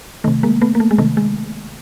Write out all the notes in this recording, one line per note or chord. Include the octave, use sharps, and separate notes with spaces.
C3 D#3 A3
G#3 A#3
A3 B3
A#3
A3
G#3
C3 D#3 A3
G#3